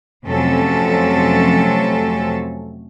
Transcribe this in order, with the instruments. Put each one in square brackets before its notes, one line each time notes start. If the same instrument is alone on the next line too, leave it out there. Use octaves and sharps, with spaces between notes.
[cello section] F2 C3 F#3 A3 C#4 A4